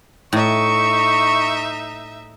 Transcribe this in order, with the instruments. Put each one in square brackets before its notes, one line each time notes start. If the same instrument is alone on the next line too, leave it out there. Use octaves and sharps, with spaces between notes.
[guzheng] A2 [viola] D#4 E5 [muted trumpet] C#6